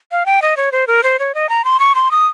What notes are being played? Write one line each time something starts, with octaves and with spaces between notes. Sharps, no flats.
F5
G5
D#5
C#5
C5
A#4
C5
C#5
D#5
A#5
C6
C#6
C6
D#6